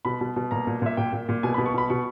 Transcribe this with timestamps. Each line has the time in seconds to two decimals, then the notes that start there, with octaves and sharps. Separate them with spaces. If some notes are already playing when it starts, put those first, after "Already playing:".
0.05 B2 B5
0.21 B2
0.36 B2
0.51 A#2 A#5
0.67 A#2
0.82 A#2 E5
0.97 A#2 G5
1.13 A#2
1.29 A#2
1.43 B2 G#5
1.54 B5
1.58 B2
1.66 C#6
1.74 B2 B5
1.90 B2 C#6